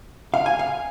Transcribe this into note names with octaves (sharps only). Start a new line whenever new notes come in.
F5
G#5
F5